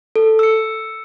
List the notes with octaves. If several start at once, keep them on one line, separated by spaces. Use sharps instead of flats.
A4
E6 C#7